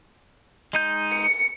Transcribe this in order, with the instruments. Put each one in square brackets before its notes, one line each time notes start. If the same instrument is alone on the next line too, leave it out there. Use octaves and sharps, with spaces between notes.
[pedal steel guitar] G#3 D#4 G6
[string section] C#7